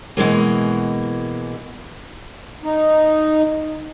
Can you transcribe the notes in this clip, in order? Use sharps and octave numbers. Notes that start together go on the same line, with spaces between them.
B2 E3 G#3 A#3
D#4